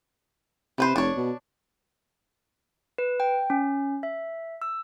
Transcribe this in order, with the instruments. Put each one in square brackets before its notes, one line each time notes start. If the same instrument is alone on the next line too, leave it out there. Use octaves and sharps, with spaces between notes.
[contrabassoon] C3 [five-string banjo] E3 B4 C5
[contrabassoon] F1 [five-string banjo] D4 C#5
[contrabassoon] B2
[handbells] B4
G5
C#4
E5
E6